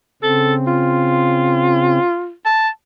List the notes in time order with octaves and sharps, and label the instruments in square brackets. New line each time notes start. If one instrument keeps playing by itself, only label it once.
[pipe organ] C#3 C4 [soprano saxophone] A4
[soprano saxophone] F4
A5